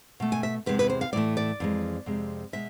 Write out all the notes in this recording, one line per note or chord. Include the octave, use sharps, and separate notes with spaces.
B2 A3
G#5
E5
E2 C3 G#3 B4
B4
C5
F5
A2 E3 A3 D5
D5
F2 E3 G#3
F2 C3 G#3
B2 G#3 E5